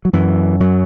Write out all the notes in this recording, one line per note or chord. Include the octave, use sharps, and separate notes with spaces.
F#3
F#2 E3
F#2 F#3